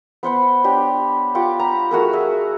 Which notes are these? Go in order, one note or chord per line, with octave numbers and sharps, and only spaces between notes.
B3 C5 F#5 B5
D4 G4 C#5
F4 G4 F#5 D6
A#5 B5
A3 F#4 G#4 A#4
G#4 E5